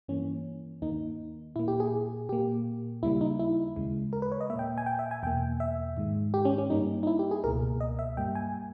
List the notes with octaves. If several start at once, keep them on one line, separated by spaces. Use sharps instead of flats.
G2 E3 A#3 C#4
D#2 D#3 A#3 D#4
A#2 A#3 E4
G4
G#4
A#2 A#3 G4
D#2 C#3 G3 A#3 E4
D#4
E4
D#2 C#3 G#3
A#4
B4
C#5
D#5
A#2 A#3 E5 G5
G#5
G5
E5
G#5
E2 B2 A#3 G5
E5
G#2 D#3 G#3
G4
C#4
C#4
G2 G3 A#3 D#4
D#4
E4
G4
G#4
C#2 B2 A#3 A#4
D#5
E5
G2 G3 A#3 G5
G#5